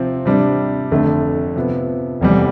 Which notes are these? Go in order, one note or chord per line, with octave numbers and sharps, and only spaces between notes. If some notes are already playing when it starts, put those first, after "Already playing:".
Already playing: C3 F3 C4 F4
C3 G3 D4
F1 F2 D3 A3
C3 F3 B3
F1 E2 C3 G3